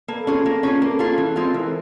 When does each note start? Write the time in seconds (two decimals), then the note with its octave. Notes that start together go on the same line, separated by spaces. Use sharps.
0.08 A#3 A4 B4
0.27 C#4 F4 G#4
0.46 A#3
0.63 C#4 F4 G#4
0.81 A#3 A4 B4
0.99 C#4 F4 G#4
1.18 E3
1.36 G#3 C4 F4
1.54 E3 A#4 C5